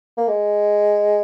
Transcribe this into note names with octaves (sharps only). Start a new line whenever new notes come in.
A#3
G#3